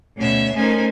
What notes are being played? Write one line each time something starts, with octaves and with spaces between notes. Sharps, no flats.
D2 B2 C#4 C#5 E5
A3 C#4 D#4 A#4 C5 G#5